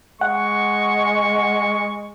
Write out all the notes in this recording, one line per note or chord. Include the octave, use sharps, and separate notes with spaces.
G#3 F#5 C#6